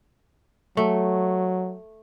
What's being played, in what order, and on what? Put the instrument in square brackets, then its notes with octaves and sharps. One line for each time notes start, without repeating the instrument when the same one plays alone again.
[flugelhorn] F#3 [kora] A3